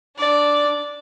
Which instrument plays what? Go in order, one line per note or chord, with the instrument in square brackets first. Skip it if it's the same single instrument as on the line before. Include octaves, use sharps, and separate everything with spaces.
[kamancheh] D4 D5